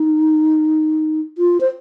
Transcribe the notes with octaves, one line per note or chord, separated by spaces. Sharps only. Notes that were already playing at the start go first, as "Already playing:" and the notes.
Already playing: D#4
F4
C5